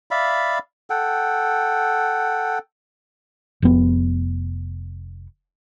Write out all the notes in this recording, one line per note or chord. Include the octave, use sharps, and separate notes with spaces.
D5 E5 F5 B5
A4 F#5 G5
F1 B3